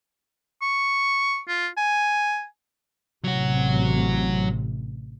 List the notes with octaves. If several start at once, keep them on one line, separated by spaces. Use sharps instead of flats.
C#6
F4
G#5
A1 C3 F#3 F#4